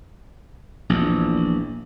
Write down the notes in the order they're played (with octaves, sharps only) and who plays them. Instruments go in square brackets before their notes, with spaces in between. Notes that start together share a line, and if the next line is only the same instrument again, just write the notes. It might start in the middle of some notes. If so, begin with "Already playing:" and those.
[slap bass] A#1 E2